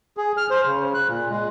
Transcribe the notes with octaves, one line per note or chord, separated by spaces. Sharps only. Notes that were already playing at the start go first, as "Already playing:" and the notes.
G#4
F6
C5
C#3
F#6
A#2
G#3